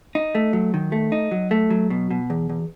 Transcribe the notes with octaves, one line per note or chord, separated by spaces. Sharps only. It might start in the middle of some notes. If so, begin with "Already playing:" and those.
D#4
A3
F#3
D#3
A3
D#4
F#3
A3
F#3
B2
B2
E2
E2